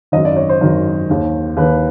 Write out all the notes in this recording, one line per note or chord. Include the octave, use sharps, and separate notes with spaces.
G#1 F#2 D#3 D#5
D5
C#5
C5
G#1 F#2 D#3
D#2 D#3
D#2 D#3 B4